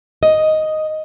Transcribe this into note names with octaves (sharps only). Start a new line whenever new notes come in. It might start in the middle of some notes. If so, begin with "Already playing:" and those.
D#5